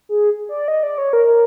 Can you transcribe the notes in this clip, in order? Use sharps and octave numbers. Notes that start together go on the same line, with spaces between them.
G#4
D5
D#5
D5
C#5
A#4